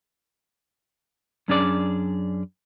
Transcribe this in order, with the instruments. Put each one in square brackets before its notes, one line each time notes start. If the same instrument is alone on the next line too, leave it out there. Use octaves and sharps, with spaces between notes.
[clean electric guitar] F#2 C#4 D4 G#4 D5